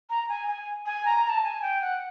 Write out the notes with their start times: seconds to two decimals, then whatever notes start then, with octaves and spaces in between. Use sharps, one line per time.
0.10 A#5
0.29 G#5
0.47 G#5
0.86 G#5
1.06 A#5
1.25 A#5
1.30 A5
1.44 G#5
1.62 G5
1.82 F#5